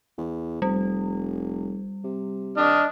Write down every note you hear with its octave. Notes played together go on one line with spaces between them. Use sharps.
E2
F1 G3
C3
D4 D#5 F6